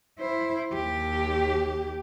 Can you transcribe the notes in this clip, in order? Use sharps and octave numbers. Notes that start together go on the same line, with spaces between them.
E4 C5
D#2 G4